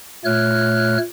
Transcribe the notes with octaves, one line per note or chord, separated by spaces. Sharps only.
A#2 A3 C#5 F6 F#6